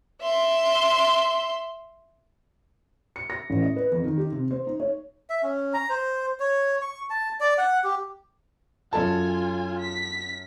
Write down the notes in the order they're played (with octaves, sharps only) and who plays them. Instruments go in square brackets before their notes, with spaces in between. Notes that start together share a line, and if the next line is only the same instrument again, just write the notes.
[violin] E5 C6
[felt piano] C#7
A#6
A1
D#5
B4
F2
D#3
G4
C3
C5
D#4
C#5
[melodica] E5
C#4
A#5
C5
C#5
C#6
A5
D5
F#5
G4
[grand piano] F#2 A4 A5 [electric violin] F4 G#5
[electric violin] B6